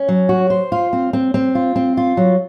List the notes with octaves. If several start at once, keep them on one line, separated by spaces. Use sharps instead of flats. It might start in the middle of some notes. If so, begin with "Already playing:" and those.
Already playing: C#4
F#3
F#4
C5
F4
C4
C4
C4
F4
C4
F4
F#3